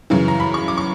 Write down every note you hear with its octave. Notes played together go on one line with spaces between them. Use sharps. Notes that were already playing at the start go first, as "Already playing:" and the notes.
F#2 C#3 E3
A#5
B5
C#6
D6
C#6